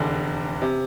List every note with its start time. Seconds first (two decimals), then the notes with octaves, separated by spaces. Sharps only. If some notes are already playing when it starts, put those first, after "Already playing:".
Already playing: F1 E2 D3
0.61 C3